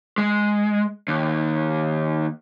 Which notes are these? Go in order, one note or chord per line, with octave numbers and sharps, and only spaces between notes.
G#3
D#2